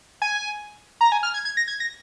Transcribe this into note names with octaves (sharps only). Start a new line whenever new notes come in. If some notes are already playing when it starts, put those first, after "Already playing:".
G#5
A#5
G#5
F6
G#6
G#6
A#6
G#6
A#6